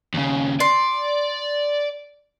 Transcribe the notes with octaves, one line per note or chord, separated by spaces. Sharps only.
D#2 C#3
D5 C6